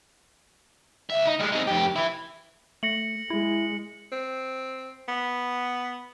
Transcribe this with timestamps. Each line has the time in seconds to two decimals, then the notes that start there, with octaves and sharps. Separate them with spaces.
1.10 C#2 E5
1.25 D#4
1.39 G3 G#3
1.52 C4 D#4
1.67 F2 G4
1.96 E3 E4
2.83 A3 A#6 C#7 F#7
3.30 G#3 E4
4.12 C4
5.08 B3